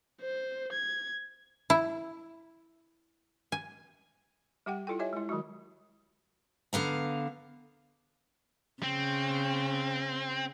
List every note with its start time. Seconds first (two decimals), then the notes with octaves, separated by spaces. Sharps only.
0.22 C5
0.73 G#6
1.70 E4
3.52 G#5
4.66 G3 G4 F#5 G5
4.87 E4 F4 A4 G5
4.99 G4 C#5 D#5 E5 G#5
5.13 G#3 E4
5.29 D#3 F#3 G#3 F#4
6.73 D3 B3 F5 A#5
8.83 C#3 C4